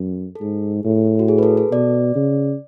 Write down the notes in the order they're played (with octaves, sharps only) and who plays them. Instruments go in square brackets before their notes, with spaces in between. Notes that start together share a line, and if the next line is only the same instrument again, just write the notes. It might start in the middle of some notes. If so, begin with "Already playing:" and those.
Already playing: [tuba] F#2 [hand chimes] A4
[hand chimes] A4
[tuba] G#2 [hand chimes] G#4
[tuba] A2
[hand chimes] F#4
G#4
B4
A4
A4
[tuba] B2 [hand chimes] D5
[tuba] C#3